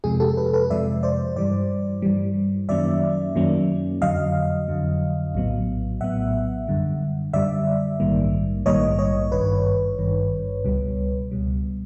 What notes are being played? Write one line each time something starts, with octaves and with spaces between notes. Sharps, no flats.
F2 C3 F3 G#3 G#4
G4 A4
A4 B4
A4 B4
F2 C3 F3 G#3 D5 E5
C5 D5
G2 E3 G3 C5 D5
G2 E3 G3
F#2 D#3 F#3 A#3 C#4 D5 E5
F#2 D#3 F#3 A#3 C#4
F2 D3 F#3 D#5 F5
F2 D3 F#3
A#1 A2 F#3 B3
A#1 A2 F#3 B3 E5 F#5
F#2 D3 G3
F#2 D3 G3 D5 E5
A#1 G#2 D#3 G3 A#3
A#1 G#2 D#3 G3 A#3 C#5 D#5
C#5 D#5
G#1 G2 D#3 B4 C#5
G#1 G2 D#3
C#2 B2 G3
C#2 B2 G3